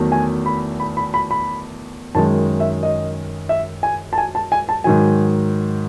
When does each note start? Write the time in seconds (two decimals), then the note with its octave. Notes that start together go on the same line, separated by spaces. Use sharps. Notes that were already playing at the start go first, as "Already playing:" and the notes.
Already playing: E2 D#3 F#3 A3
0.12 G#5
0.46 B5
0.80 B5
0.97 B5
1.14 B5
1.31 B5
2.15 F#2 D#3 G#3 A5
2.60 E5
2.83 D#5
3.49 E5
3.83 G#5
4.13 A5
4.18 G#5
4.35 A5
4.52 G#5
4.69 A5
4.84 G#2 D#3 F#3 G#5